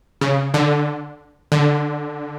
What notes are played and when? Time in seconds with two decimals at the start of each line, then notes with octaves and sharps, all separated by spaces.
0.21 C#3
0.54 D3
1.52 D3